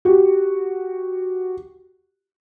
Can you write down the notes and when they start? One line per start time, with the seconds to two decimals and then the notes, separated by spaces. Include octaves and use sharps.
0.05 F#4 G4